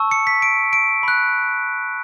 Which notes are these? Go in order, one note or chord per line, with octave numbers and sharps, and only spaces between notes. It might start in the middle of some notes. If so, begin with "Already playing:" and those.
Already playing: A5 C#6 E6
C#7
B6
D7
D7
B5 F#6